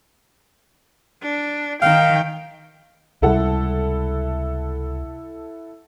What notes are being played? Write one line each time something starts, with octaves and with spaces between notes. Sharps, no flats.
D4
D#3 F5 G5
C#2 C3 G3 E4 A4 F#5